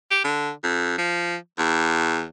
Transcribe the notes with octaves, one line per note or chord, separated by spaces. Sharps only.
G4
D3
F2
F3
E2